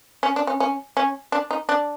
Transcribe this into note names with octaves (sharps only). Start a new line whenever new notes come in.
C#4
D4
C#4
C#4
C#4
D4
D#4
D4